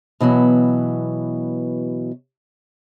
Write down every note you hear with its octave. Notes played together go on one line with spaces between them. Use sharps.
B2 E3 F#3 B3